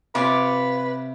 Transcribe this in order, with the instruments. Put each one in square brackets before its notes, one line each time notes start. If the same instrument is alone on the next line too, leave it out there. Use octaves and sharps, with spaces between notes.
[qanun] C3 C#5 G#5 [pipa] F4 [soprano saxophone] B4 [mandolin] D6